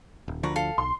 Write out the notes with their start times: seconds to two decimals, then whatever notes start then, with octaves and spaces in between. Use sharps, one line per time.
0.28 D#1
0.43 D2 D3 F3 A#4 B4 C#6
0.56 A4 F5
0.78 B1 C6